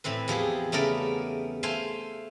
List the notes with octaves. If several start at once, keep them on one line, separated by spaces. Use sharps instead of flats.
A2 E3 C4 B4
E2 F3 G4 G#4
C#3 A3 B3 A#4 D5
A3 C5 F5 G#5 C6